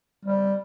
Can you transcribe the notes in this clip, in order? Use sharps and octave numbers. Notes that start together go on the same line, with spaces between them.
G3